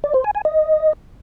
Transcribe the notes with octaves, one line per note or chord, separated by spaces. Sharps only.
D5
C5
G#5
G#5
D#5